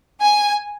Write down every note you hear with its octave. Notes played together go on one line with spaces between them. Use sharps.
G#5